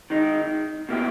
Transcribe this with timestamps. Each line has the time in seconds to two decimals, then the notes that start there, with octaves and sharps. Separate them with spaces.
0.10 D#3 G#3 D#4
0.89 B2 A#3 E4 G4